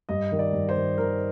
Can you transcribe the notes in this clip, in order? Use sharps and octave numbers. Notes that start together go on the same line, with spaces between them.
G2 D#5
D#3
D5
G2
C5
D#3
D#3 A#4